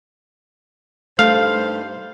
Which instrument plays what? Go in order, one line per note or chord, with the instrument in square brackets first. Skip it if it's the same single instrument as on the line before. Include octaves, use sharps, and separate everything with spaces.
[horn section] G2 D#4 C5 [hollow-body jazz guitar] A3 [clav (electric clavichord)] F5